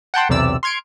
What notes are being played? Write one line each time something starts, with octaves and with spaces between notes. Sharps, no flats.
F#5 G5 A5 C6
B1 E2 C3 D5 E6
C6 F6 G#6 C#7 D7